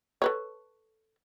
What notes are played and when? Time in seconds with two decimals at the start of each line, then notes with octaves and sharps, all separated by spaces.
0.22 A4 B4 C#5